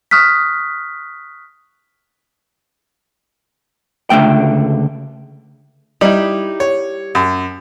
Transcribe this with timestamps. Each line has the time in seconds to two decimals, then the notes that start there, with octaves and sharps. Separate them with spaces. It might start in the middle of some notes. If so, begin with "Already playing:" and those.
0.11 C#6 D#6 F6 F#6 B6
4.10 C#2 D3 A3 G5
6.01 G3 D#4 E4
6.60 C#5
7.15 F#2